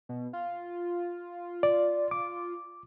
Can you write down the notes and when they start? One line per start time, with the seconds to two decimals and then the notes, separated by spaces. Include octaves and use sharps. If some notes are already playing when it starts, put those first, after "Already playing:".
0.09 B2
0.33 F4
1.63 D5
2.11 D6